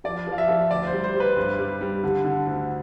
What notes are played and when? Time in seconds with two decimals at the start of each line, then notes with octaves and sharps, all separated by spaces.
0.04 F3 D5
0.27 F3
0.32 F5
0.38 E5
0.48 F3
0.71 D2 D5
0.87 C5
0.92 G3
1.04 C5
1.14 G3
1.20 B4
1.37 G2
1.59 G3
1.81 G3
2.04 D3
2.25 D3
2.46 D2